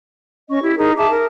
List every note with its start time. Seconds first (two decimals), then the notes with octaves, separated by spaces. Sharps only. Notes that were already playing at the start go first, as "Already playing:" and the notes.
0.49 C#4 D#5 C#6
0.62 E4 G4
0.77 D#4 G#4 A#4
0.97 G#4 E5 A5 D6
1.09 A#4